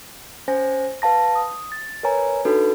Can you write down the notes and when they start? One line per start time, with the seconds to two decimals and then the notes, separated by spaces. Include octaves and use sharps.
0.48 C#4 C5 G#5 A#6
1.02 B4 F5 A5 A#6
1.35 D#6
1.72 A6
2.03 A#4 B4 C#5 G#5 A#5
2.45 D4 D#4 F#4 A4 B4